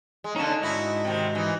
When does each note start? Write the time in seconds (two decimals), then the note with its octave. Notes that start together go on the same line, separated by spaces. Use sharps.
0.24 G#3
0.36 D3 A#3 C#4 D#4 A5
0.62 G#2 D#4 E4 F#4
1.04 C3 D#3
1.35 E3 D#4